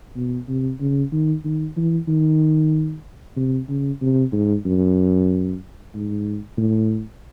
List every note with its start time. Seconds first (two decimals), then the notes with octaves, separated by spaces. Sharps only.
0.16 B2
0.49 C3
0.81 C#3
1.12 D#3
1.45 D#3
1.77 E3
2.08 D#3
3.36 C3
3.69 C#3
4.01 C3
4.33 G#2
4.66 F#2
5.94 G#2
6.58 A2